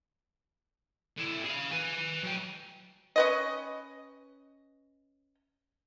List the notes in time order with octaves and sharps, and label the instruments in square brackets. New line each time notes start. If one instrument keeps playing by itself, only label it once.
[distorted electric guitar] D3 E4
G#4 F5
B4 G#5
F#3 G5
[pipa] C#4 B4 D#5